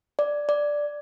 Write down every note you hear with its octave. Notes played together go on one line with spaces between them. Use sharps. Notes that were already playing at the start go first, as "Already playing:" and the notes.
D5
D5